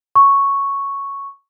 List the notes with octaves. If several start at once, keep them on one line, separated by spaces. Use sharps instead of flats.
C#6